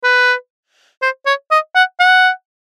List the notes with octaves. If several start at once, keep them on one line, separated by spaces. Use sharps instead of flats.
B4
C5
C#5
D#5
F#5
F#5